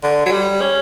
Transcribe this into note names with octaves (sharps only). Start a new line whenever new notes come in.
D3
F#3
G3
C#4